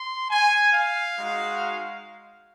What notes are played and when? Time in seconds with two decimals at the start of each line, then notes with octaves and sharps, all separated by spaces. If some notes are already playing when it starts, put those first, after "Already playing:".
Already playing: C6
0.31 G#5
0.73 F5
1.16 G#3 D#4 F#4